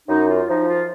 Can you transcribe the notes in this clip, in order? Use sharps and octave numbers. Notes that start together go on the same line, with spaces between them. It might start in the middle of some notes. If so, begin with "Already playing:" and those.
F#2 D#4
F4
F3 D#4
F4